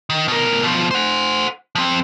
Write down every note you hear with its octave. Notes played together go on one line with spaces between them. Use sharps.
D#3
B2 A#4
B2 F3
C5 F#5
F3 C4